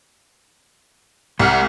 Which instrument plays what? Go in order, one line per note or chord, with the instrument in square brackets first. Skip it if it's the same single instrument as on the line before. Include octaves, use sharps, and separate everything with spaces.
[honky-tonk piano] C2 F6 [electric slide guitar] G#3 F#5